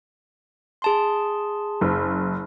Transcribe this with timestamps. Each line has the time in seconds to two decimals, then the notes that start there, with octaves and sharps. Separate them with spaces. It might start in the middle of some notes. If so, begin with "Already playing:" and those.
0.82 G#4 A5 C6
1.81 F#1